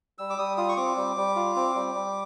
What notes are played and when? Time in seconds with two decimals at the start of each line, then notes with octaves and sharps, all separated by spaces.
0.18 G3 E6
0.30 D6
0.38 G3 D#6
0.57 F4 D#6
0.69 C#6
0.77 C4 D6
0.97 G3
1.17 G3
1.36 F4
1.56 C4
1.75 G3
1.94 G3